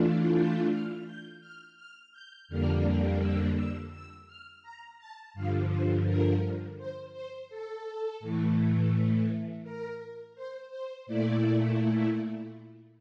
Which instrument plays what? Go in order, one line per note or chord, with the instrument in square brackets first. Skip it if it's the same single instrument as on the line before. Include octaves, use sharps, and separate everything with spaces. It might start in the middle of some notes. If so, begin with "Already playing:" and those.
Already playing: [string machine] E3 A3 D4 F4
G6
F6
G6
F6
F6
G6
F2 D3 G3 A#3 D4 F6
E6
E6
E6
F6
A#5
A5
G2 D3 F3 F5
C5
A#4
C5
C5
A4
A2 E3 A3
A#4
C5
C5
A#2 A3 E4 D5